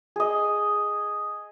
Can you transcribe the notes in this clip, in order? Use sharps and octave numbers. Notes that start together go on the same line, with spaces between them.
G#4 D#5